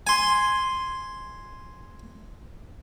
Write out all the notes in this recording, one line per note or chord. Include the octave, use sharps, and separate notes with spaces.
G#5 C6